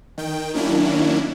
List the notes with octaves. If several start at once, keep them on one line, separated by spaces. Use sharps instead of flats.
D#3 G5
D#3 F#3 A#3 C#4 D4 E4